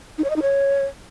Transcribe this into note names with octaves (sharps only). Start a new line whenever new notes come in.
D#4
C#5
D#5
D#4
C#5